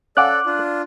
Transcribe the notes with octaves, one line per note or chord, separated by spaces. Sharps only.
C#4 A4 D5 F5 F#5 D6 F#6
D4 F4